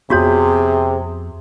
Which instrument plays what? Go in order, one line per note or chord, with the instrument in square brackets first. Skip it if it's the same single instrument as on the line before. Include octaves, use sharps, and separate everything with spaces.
[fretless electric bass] F2 B3 [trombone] C3 [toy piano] F4 F#4 C#5 [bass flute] G#4